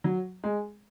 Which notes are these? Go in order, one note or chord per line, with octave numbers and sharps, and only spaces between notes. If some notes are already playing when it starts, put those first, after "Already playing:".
F#3
G#3